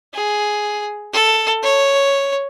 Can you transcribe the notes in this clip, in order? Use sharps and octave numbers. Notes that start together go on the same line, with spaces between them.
G#4
A4
C#5